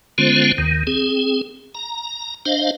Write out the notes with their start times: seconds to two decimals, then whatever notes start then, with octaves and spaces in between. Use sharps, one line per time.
0.18 D3 G#3 B3 C#4 F4 C5
0.58 D#2 D#3
0.87 C4 G#4
1.75 A#5
2.46 D4 C5 D#5 F5